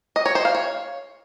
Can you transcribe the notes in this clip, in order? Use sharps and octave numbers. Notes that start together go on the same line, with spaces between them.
D#5
C#5
C5
F5
C#5